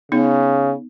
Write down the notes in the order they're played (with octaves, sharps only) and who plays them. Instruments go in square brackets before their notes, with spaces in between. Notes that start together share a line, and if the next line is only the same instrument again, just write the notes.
[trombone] C#3 [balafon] B3 D#4